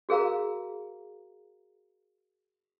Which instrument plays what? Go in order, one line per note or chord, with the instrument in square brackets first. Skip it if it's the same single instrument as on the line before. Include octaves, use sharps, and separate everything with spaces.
[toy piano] F#4 G#4 A#4 F5 A#5